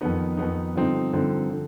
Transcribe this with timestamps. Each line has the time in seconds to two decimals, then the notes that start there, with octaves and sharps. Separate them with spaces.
0.01 F2 D#3 B3 D#4
0.37 F2 D#3 B3 D#4
0.75 G2 D3 F3 C4 D#4
1.13 G2 D3 F3 C4 D#4
1.50 D3 F3